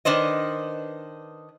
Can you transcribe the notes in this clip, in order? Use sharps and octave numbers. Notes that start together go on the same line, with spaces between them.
D#3 D4 B4 C5 D#5